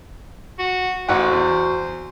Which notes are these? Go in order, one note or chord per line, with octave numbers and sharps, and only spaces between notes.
F#4
A1 F#4 C5 F#5
E2